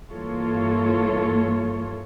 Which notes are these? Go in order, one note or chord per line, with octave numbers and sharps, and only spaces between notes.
G2 E3 A#3 F4 A4 C#5